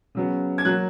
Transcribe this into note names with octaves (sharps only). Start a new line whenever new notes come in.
C#3 F#3 B3
G#6
F#3 A#3 F#6